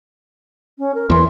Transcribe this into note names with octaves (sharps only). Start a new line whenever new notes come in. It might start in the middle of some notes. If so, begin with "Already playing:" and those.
C#4
A#4
E2 E3 C6